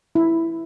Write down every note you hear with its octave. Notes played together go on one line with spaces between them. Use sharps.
E4